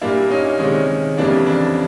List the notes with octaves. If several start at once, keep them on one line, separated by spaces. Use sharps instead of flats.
A#2 G3 A#3 D4 E4
C#4 D#4
C3 D#3 G#3 C#4
F2 C#3 E3 G3 A#3 D4
D4